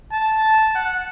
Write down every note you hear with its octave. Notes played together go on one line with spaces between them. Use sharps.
A5
F#5